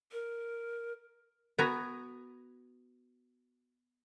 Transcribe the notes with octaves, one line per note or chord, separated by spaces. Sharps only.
A#4
B3 F#4 G#5 A#5